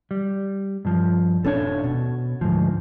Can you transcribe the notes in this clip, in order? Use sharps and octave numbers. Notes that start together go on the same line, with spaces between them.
G3
G2 F3
D#1 C#4 D4 A4 C#5
B2
D2 G#2 F3